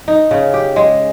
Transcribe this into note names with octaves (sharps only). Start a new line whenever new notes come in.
D#4
C#3
G4
G#3